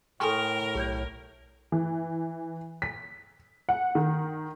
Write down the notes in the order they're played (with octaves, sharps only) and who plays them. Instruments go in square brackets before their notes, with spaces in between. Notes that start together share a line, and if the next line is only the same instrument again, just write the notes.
[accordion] A2 [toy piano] A4 G#5 C6 [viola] A#4 [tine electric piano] G5 C#6 F6
[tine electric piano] B1 [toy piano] G4 C#5 D5
[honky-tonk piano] E3
B6
F#5
D#3